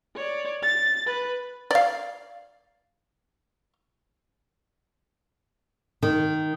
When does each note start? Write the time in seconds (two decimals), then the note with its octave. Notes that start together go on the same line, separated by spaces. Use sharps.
0.16 C#5 D5
0.63 A6
1.06 B4
1.71 D5 F5
6.02 D#3